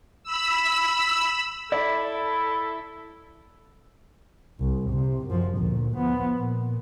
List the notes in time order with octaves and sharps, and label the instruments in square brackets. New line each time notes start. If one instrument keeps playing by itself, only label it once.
[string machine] B5 E6
[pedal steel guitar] E4 [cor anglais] A4 [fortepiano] D5
[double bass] C2
C3
F#2 F3
D2 A#2
F3 B3
A#2